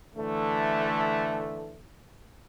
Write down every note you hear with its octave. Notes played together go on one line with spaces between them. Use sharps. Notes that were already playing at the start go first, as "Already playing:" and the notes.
D3 E3 A3